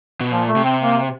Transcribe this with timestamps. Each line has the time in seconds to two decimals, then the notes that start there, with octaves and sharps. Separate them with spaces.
0.20 B2
0.32 A#2 F3
0.48 A3
0.56 C3
0.64 C4
0.81 A#3